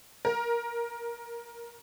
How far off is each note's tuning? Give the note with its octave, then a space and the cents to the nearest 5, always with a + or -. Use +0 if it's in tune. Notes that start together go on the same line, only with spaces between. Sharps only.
A#4 +10